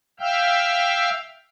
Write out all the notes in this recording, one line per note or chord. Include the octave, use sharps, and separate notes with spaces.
E5 F5 G5 E6 F6 G6